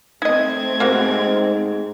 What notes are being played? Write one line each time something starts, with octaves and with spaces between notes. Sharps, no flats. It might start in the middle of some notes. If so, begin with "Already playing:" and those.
A3 C4 D#4 D#5 G#6
G#2 A#3 F#4 G4